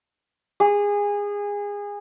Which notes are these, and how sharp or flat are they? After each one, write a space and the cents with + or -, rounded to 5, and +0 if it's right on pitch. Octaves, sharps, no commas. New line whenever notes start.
G#4 -25